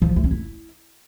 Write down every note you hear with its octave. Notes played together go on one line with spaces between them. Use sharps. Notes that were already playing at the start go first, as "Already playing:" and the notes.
F3
F4
A3
C#4
E4